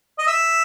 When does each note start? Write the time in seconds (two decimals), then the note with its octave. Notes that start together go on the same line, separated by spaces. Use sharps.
0.19 D#5
0.27 E5